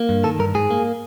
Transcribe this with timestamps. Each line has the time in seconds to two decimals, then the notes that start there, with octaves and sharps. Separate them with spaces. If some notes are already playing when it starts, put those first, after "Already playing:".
Already playing: A#3
0.09 G2
0.24 D#3 A4
0.39 G2 A#4
0.55 G#2 G#4
0.70 A#3